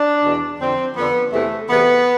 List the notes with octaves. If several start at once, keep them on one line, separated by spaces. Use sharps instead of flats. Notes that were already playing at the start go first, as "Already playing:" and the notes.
Already playing: D4
E2 B2
F2 D3 C4
F2 D3 B3
E2 C3 E3 A3
E2 C3 E3 B3